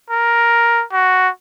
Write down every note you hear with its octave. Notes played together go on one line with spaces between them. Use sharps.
A#4
F#4